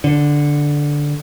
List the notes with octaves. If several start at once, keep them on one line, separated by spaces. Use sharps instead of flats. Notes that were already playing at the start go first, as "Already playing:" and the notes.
D3